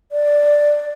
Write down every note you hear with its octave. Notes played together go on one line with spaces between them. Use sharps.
D5